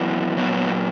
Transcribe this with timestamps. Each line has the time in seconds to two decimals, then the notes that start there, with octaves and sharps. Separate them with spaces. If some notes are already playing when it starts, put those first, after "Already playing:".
Already playing: F#2 E3 B3
0.37 A#2 F#3 B3
0.53 B3